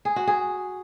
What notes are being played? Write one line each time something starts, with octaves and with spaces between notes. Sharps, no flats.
G#4
F#4
G#4